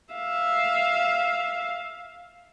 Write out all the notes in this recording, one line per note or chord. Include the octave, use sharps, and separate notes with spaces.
E5 F5